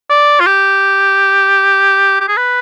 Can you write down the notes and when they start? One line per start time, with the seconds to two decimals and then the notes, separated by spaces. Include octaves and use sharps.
0.10 D5
0.40 F4
0.47 G4
2.21 G4
2.28 G#4
2.37 B4